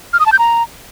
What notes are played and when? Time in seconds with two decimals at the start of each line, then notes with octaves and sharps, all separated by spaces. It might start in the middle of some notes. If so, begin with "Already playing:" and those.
0.13 F6
0.20 D#6
0.26 A5
0.32 G6
0.39 A#5